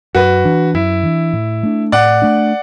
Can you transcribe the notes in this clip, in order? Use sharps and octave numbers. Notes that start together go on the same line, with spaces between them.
F#2 F#4 B4
E3 D4
F#2 E4
E3 D4
A2
A3 D4
A2 D5 F#5
A3 D4